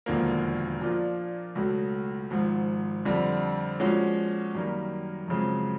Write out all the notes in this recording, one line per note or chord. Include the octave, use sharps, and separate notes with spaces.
E1 D#2 D3 F3 A#3
A#2 F3 A#3 D4 F4
C#2 B2 F#3 A3
G#1 G#2 F3
F2 D3 G3
A#2 F3 G#3 C#4 F#4
F#2 D#3 G3 A#3
F#2 C#3 F3 G#3 C4